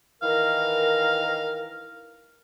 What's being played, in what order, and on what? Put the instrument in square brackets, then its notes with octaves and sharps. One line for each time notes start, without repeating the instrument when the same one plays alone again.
[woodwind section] D#3 E3 A#4 [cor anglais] F5